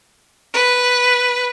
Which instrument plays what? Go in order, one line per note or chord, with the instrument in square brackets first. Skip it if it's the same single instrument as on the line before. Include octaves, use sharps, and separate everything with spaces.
[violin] B4